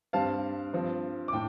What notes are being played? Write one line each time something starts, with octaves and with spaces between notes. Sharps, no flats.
G2 G3 C4 F5 A5
G2 F3 C4
D6
A2 G5